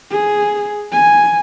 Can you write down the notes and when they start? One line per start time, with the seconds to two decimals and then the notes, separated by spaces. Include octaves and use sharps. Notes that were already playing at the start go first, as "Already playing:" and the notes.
0.10 G#4
0.92 G#5